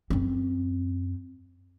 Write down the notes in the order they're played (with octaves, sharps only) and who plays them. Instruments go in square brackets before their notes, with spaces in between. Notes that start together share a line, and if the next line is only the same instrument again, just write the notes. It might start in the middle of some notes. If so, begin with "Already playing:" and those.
[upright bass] F#2 C4